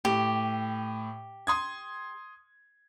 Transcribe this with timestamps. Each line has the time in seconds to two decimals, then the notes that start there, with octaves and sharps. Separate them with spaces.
0.05 A2 G4
1.47 C6 D#6 G#6